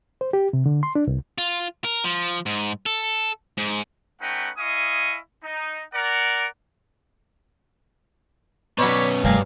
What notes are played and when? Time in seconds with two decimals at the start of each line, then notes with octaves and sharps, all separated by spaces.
0.21 C5
0.33 G4
0.53 C3
0.66 D3
0.83 C6
0.95 D4
1.07 C2
1.38 F4
1.84 A#4
2.04 F3
2.46 G#2
2.86 A4
3.58 G#2
4.21 A3 C#4 D#4 B4 F#5 G5
4.58 E4 D#5 F5 G#5 C#6 D#6
5.44 D#4
5.94 A#4 D5 F#5
8.79 B2 F#3 B3 C#4 C#5 D5 B5
9.24 F1 G2 G3 A3 G#4 A#4 F5